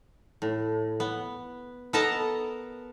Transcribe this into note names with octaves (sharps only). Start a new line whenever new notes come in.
A2
B3
B3 A4 A#4 D#5 A5 A#5